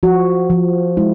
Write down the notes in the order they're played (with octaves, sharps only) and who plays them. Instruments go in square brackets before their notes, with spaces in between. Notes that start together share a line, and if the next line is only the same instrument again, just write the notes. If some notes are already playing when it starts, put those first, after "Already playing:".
[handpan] F3 F#4
F3
G#3 E4